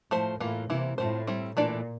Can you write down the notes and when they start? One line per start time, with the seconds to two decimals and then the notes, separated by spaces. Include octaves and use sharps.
0.11 A2 F3 A3 C5
0.40 A2 E3 A#3 F4
0.70 C3 E3 A#3 E4
0.98 A2 A3 C4 F4 C5
1.27 G3 C4 E4
1.57 A#2 E3 A3 D4 A4 D5